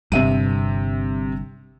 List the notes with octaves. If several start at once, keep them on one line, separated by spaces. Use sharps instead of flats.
G1 G2 C3 E5 D#7